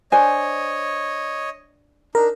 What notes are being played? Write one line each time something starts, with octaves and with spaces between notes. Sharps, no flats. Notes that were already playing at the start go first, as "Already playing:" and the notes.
D4 C5 C#5 D#5 G#5
D4 D#4 A#4